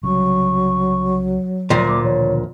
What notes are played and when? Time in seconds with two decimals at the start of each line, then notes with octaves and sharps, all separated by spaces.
0.03 C2 C#3 F#3 G3 C#6
1.70 D2 A#2 D#3 F3 A3
1.88 A#3 D6
2.04 B2 D#3 F3 C#5